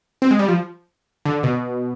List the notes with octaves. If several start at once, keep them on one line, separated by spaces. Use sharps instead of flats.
C4
G#3
G3
F3
D3
B2